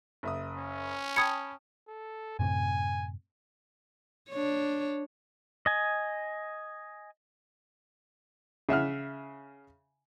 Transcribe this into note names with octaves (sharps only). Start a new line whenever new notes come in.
F#1 E5 D#6
C#4
G5 A5 B5 D#6 G#6 C#7
A4
F#2 A2 C3 G#5
D4 C#5
D#5 G#5
C#3 E5 F#5 F6